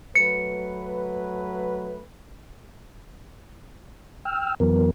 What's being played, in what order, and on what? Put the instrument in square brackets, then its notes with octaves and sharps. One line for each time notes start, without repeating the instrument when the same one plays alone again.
[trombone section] F#3 A3 B4 [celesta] C#7
[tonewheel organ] G5 E6 F6
F2 E3 F#3 B3 A#4